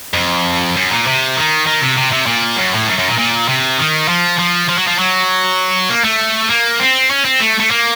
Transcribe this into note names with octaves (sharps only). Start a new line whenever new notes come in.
F2
F#2
A#2
C3
D#3
D#3
C3
C3
C3
A#2
F#2
A2
F#2
F#2
A#2
A#2
C3
D#3
F3
F3
F3
F#3
F3
F#3
A#3
A3
A#3
C4
C#4
C4
A3
A3
A#3